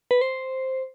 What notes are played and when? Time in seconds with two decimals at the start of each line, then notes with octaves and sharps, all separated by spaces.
0.11 B4
0.21 C5